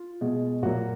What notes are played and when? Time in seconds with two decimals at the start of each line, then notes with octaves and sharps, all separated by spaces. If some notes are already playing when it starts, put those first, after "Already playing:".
Already playing: F4
0.21 B2 G#3
0.62 A#2 F#3 A#3 F#4